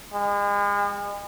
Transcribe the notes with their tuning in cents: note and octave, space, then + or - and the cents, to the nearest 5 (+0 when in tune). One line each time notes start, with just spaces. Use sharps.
G#3 -40